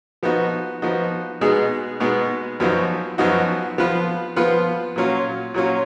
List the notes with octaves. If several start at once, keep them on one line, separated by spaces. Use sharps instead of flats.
F3 B3 D#4 F#4
F3 B3 D#4 F#4
B2 G#3 B3 D#4 G#4
B2 G#3 B3 D#4 G#4
F#2 F3 B3 D#4 F#4
F#2 F3 B3 D#4 F#4
F3 B3 F4 B4
F3 B3 F4 B4
A#2 F#3 C#4 F4
A#2 F#3 C#4 F4